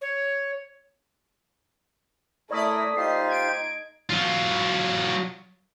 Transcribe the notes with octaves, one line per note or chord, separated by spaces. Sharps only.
C#5
A3 E4 A#4 C#5 D5 D#6 B6
D#4 F4 G4 C5 C7
G#6 D7
F#3 F4